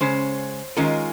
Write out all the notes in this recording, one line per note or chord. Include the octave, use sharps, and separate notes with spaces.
C#3 G#3 C#4 C5
D#3 G#3 C#4 F4 A#4